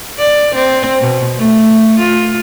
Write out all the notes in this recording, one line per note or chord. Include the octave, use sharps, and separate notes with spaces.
D5
C4
B2
A3
F4